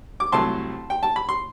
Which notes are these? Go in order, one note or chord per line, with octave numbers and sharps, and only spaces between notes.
D6
C2 C3 F#3 A3 C4 A5 C6
G5
A5
B5
C6